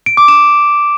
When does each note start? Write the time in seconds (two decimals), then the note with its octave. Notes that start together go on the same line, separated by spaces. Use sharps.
0.06 D7
0.17 D6
0.28 E7